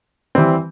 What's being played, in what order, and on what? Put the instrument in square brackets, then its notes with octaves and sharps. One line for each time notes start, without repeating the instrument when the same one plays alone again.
[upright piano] E3 G3 C4